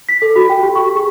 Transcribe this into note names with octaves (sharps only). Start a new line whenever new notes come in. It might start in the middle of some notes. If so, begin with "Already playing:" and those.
B6
A4
F#4
G5
G4
C#6
G#4